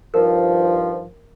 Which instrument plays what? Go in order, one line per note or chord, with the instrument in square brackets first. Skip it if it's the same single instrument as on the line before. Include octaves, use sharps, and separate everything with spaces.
[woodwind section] G2 D#3 F3 [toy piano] A#4